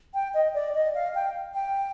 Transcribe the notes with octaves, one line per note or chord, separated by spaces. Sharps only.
G5
D#5
D5
D#5
F5
G5
G5